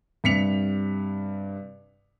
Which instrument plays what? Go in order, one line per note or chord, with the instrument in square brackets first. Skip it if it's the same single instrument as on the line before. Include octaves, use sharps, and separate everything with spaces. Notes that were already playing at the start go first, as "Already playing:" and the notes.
[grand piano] G2 C3 B6 C#7 F7